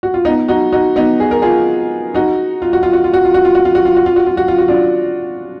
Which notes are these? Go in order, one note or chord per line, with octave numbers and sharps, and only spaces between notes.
F#4
F4
B3 D#4
D#4 F#4
D#4 F#4
B3 D#4
G#4
A#4
F4 G#4
D#4 F#4
F4
F#4
F4
F#4
F4
F#4
F4
F#4
F4
F#4
F4
F#4
F4
F#4
F4
F#4
F4
F#4
F4
F#4
D4 F4